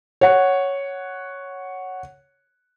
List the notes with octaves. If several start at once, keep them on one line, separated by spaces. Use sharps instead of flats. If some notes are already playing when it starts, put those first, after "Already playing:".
C#5 F#5